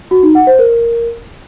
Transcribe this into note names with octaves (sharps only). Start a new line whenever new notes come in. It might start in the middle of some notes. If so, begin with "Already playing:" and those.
F#4
D#4
F#5
C5
A#4